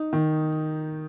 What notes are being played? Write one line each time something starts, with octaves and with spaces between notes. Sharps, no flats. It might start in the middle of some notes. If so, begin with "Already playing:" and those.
Already playing: D#4
D#3